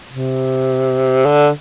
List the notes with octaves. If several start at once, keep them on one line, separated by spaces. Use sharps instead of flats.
C3
D3